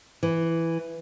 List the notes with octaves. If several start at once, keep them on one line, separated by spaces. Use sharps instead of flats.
E3